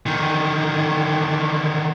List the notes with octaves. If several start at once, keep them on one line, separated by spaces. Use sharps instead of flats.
D3 D#3